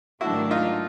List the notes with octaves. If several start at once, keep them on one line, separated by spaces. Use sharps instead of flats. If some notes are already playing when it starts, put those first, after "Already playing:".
G#2 D#3 F#3 A3 D4 E4 F#4
D#4 F4